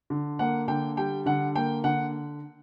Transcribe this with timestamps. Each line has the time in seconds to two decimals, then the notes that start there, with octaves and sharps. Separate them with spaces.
0.10 D3
0.39 A#3 F#5
0.68 D3 G5
0.97 G3 G5
1.26 D3 F#5
1.55 A#3 G5
1.84 D3 F#5